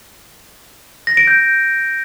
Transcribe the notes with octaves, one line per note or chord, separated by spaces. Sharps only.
A#6
D7
G6